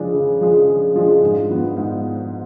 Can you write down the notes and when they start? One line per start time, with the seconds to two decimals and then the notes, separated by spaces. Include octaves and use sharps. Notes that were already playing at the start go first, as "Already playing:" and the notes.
Already playing: C#3 F3 G#3 D4 G#4
0.14 C#3
0.41 F3 G#3 D4 G#4
0.68 C#3
0.96 F3 G#3 D4 G#4
1.22 G#2
1.49 F3 B3 D4
1.76 G#2